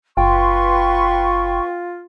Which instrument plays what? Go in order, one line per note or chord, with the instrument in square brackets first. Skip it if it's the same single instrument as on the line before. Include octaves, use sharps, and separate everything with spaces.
[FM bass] F#1 [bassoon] F4 [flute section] B4 C6 C#6 [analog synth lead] G5